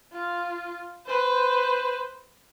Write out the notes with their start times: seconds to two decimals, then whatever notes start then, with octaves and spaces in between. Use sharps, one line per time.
0.13 F4
1.06 B4 C5